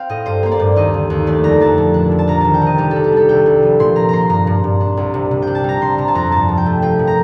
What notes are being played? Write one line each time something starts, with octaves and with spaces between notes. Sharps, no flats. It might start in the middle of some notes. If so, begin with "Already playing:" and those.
Already playing: C4 F5 G5
A2 D#5
G2 C5
A#3 C5
D5
G2
D#2 D#5
D3
D#2
A3 D5
F2 A#5
F2 A5
A#2
D4
A#2
A5
C2 A#5
D#3 A5
G5
C3 D#5
G3 G4
A4
D4
G4
G3 A4
C2 G5
C2
F3
A#2 C6
C4 A#5
A#2 A#5 C6
G2 A#5
G2
G2
D4
C2
C3
C3
D4 G5
A5
G3 A#5
C3 C6
C3 A#5
A5
F2 A#5
G2 A5
G2
G5
A3
F3 G5
A#2
A#5